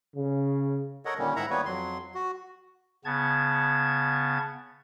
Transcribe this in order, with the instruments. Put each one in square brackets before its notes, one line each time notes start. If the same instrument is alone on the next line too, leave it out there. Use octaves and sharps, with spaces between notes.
[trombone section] C#3
[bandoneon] A4 A#4 C#5 D#5 F#5
A#2 D3 D#3 G3 A#3 C#4
G#2 E4 E5 F#5 A#5
D#3 G3 A#3 B3 B4 C#5
F2 F#3 C6
F#4
[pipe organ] C#3 B3 A5 G#6